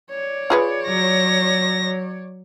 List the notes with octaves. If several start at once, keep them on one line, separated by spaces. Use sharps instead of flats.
C#5 D5
F4 G#4 B4
F#3 A#6